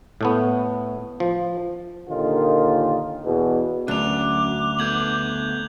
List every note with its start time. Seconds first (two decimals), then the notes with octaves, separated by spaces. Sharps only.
0.21 A2 A3 B3
1.20 F3
2.09 D#2 A#2 D3 D#3 D#4 F4
3.24 E2 B2
3.88 D2 F#3 C#4 D6 F#6 F7
4.79 B3 A4 B4 G6 G#6 F#7